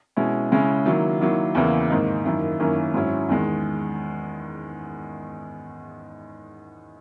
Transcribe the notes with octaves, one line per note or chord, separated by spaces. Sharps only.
B2 G#3 C#4 E4
C#3 G#3 C#4 E4
D#3 F#3 A#3 E4
D#3 F#3 A#3 E4
E2 C#3 E3 A#3 E4
G#2 D#3 A#3 D#4
F#2 D#3 A#3 E4
F#2 D#3 A#3 C#4 E4
G#2 F#3 C#4 E4
E2 D#3 G#3